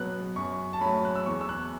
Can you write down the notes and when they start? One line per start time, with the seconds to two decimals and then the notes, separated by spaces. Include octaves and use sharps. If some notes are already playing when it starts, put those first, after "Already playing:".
Already playing: B2 F#3 B3 F#6
0.36 F#2 C#6
0.73 A5
0.81 F#3 A3 C#4 B5
1.05 F#6
1.16 E6
1.26 E2 C#6
1.41 E6
1.49 F#6